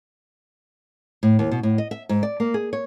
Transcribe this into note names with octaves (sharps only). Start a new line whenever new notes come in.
A2
D#2
B2
A2
D#5
E5
G#2
D5
A#3
G#4
C#5